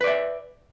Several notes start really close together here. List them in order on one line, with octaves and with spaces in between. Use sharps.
B4 D5 E5